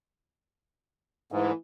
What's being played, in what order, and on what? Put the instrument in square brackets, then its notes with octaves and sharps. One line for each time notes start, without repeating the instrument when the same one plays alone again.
[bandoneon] G#2 [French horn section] E3 A3